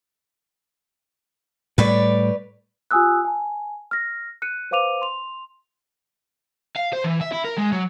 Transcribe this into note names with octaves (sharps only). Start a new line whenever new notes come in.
A2 G3 B4 C#5 D5
F4 G4 G#5 D#6 E6 F#6
G#5 A5
F6 A#6
F#6 C#7 D#7
B4 C5 F5 D6 D#7 F7
C6 F7
F5
C5
E3
E5
E4
A#4
G#3
F#3